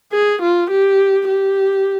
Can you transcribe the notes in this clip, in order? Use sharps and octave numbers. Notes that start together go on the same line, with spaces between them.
G#4
F4
G4
G4